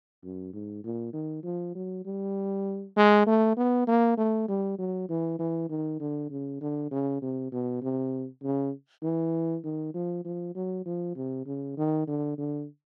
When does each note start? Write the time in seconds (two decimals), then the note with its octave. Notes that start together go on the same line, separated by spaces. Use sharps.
0.23 F#2
0.53 G#2
0.84 A#2
1.13 D#3
1.44 F3
1.75 F#3
2.05 G3
2.96 G#3
3.27 A3
3.57 B3
3.87 A#3
4.18 A3
4.48 G3
4.79 F#3
5.09 E3
5.39 E3
5.70 D#3
6.00 D3
6.30 C#3
6.61 D3
6.91 C#3
7.22 C3
7.52 B2
7.82 C3
8.43 C#3
9.03 E3
9.64 D#3
9.94 F3
10.25 F3
10.55 F#3
10.86 F3
11.16 C3
11.46 C#3
11.77 D#3
12.07 D3
12.38 D3